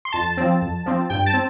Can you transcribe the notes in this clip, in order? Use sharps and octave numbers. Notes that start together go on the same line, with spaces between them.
C6
F2 A5
F3 C4
F2
F3 C4
G2 G5
A5
C4